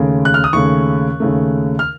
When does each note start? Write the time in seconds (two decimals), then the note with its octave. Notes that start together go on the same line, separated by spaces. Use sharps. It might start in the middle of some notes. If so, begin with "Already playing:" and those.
Already playing: D#2 C#3 A3
0.25 F#6
0.34 F6
0.44 D#6
0.53 D#2 C#3 A3 C#6
1.20 D#2 C#3 A3
1.79 F6